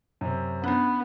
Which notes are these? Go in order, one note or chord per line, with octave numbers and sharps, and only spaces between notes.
F#2 C3
B3 C#4 D4